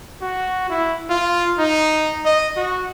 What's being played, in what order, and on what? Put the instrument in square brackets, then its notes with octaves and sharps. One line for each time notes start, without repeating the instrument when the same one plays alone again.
[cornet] F#4
E4
F4
D#4
D#5
F#4